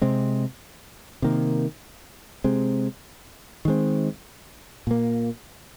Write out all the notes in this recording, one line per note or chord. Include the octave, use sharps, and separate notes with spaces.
C3 G#3 C4
C3 D#3 A#3
C3 G#3 C4
D#3 G#3 C4
A#2 A#3